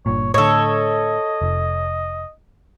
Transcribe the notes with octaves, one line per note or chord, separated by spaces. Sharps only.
G1 G2 A#2 C#5
A2 D3 A4 C#5 D#5
F1